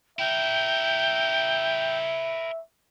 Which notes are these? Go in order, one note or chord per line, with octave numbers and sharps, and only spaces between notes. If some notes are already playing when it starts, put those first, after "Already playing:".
E4 A#4 E5 G5